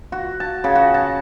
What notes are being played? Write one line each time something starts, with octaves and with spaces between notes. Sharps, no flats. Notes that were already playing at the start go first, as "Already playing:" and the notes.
F#4
A5
C#3
F#4
A5